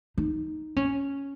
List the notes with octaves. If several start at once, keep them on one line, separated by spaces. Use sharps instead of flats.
D#4
C#4